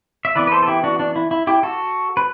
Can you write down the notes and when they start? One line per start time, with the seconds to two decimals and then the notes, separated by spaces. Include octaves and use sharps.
0.25 E5
0.35 E3 B3 B4 D5
0.47 B4
0.52 A4 C5
0.63 A4
0.67 E4 G4
0.84 D4 F#4
0.99 D4
1.16 E4
1.31 E4
1.47 E4 G4
1.63 F#4 A4
2.17 B4